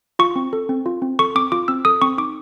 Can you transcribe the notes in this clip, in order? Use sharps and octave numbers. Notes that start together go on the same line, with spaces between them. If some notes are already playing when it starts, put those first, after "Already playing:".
F4 C#6
C4
A4
C4
F4
C4
A4 C#6
C4 D6
F4 D6
C4 E6
A4 D#6
C4 C#6
D#4 D6